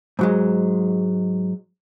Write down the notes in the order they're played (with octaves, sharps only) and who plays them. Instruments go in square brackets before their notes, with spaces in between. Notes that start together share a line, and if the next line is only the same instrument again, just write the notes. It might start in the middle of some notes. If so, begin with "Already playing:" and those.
[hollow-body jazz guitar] G#2 F#3 G#3